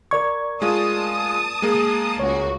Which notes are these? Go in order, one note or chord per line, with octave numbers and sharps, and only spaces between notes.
A#4 D5 C#6 G#6
G#3 F4 A5 D#6
G#3 A#3 G#4
C#2 F#4 C#5